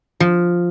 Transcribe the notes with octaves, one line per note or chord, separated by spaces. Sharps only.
F3